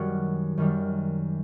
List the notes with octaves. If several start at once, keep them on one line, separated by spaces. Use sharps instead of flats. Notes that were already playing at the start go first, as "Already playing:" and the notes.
Already playing: F#2 D#3 G3 F#4
F#2 D#3 G3